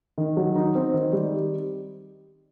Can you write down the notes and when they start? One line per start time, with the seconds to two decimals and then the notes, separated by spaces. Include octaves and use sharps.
0.18 D#3
0.37 F#3
0.56 D#4
0.75 C4
0.94 D#3
1.13 G3